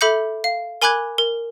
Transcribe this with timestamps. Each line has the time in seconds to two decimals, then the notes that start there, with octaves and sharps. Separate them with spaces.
0.01 A4 E5 B5 D6 G6 C#7
0.44 F5
0.82 A#4 G#5 B5 D6 F#6 G#6
1.18 A#4